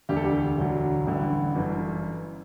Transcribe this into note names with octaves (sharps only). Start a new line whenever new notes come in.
E1 D2 D3 G4
A4
G4
E1 D2 D3 F#3
A1 G2 D3
G1 F#2 E3